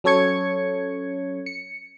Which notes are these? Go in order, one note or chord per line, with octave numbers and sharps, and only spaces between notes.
F#3 C#4 A4 C#5 G#6 C#7
C#7